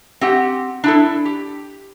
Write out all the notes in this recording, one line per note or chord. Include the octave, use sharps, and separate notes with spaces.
C4 G4 F#5
D4 E4 A4
G4